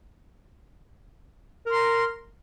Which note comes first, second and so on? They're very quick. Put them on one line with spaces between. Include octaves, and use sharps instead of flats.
A#4 C6 A#5